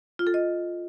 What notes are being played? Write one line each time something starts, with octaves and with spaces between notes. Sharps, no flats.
F4
A4
D#5